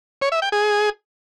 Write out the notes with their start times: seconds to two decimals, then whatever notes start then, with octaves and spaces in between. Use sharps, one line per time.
0.22 C#5
0.32 E5
0.42 G5
0.52 G#4